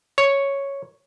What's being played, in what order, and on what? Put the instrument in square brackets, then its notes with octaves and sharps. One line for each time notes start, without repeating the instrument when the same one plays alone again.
[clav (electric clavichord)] C#5